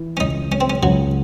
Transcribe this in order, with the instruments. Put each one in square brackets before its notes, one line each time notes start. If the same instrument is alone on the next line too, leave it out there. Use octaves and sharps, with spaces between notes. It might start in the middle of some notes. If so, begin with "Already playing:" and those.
Already playing: [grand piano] E3
[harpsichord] C#4
[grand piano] C#2 [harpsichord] D#4
[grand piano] G#3 [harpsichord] C#4
[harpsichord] C4
C#4
[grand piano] C#2 [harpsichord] F#3